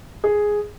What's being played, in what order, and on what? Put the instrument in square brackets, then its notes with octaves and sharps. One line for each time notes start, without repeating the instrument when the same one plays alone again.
[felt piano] G#4